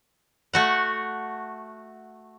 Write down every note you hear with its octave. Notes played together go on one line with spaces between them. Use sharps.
A3 F#4 F#5